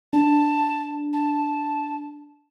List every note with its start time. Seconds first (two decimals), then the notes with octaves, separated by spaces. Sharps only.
0.13 D4 A5
1.13 A5